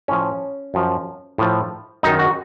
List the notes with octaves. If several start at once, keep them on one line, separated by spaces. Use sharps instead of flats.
A2 F3 C#4
F#2 F3
A2 F3
F#2 D#3 D#4
F#4